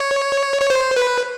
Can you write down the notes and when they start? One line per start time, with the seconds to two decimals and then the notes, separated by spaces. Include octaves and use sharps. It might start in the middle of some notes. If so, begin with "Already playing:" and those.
Already playing: C#5
0.61 C#5
0.70 C5
0.96 B4